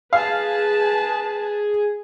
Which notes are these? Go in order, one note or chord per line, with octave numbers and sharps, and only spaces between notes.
G#4 B4 F5 A5